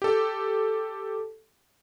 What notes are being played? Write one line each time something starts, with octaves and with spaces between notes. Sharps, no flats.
G4 A4